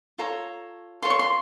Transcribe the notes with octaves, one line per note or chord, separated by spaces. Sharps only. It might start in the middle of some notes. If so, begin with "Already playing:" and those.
F4 A4 C#5 A#5
F4 A4 C#5 C6
C#6
C6